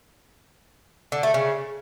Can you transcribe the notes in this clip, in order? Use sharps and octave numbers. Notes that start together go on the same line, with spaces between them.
D3
A3
C#3